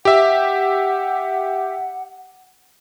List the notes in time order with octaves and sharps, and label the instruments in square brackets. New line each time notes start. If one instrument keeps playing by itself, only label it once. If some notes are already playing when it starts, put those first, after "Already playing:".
[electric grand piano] G4 E5 [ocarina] F#5